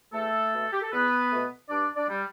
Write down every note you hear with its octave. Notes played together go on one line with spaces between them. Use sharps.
E2 A3 A4
B2 A3
G4
A4
E2 B3 B4
B2 A3
G2 D4 D5
D4 D5
G3